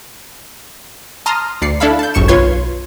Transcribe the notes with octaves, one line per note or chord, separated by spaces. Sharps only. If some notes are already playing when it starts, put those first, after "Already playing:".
A5 A#5 C6 D#6 F6
D2 D5 C7 C#7
D4 E4 A4 F5 B5
A5 G6
G#1 C#2 F#2 C#6 C#7 E7
B1 F4 B4 C#5 C6 G#6